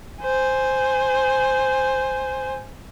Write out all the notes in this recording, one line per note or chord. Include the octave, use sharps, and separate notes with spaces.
C5 G#5